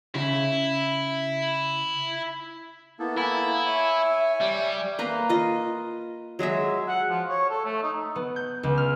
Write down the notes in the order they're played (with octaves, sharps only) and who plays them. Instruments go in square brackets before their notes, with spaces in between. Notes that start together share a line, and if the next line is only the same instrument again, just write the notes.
[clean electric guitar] C#3 [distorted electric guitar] E4
[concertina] A#3 B3 A4 [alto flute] E4
[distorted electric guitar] E4 [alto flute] G#5
[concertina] C#5 G#5 [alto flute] E5
[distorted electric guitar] G3
[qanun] A#3 B4 A#5 C6
F4 D#5
F#3 G#3 G#4 E5
[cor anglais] F#5
F3
C#5
A4
A3
D#4
[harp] B3
G6
C#2
F6